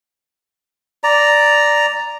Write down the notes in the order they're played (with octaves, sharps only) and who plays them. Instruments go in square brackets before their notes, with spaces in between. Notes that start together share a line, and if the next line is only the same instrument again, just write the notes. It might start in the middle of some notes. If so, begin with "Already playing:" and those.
[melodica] D5 A#5